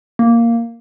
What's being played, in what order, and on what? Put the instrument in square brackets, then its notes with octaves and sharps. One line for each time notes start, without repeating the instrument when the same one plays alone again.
[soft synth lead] A#3